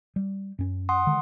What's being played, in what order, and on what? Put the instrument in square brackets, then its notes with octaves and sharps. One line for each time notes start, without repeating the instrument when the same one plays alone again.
[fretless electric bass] G3
F#2 C#4
[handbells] F#5 C6 D#6
[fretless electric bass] D3 D#3 G#3